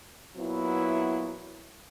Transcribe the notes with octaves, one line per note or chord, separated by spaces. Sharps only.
A#2 F#3 B3 E4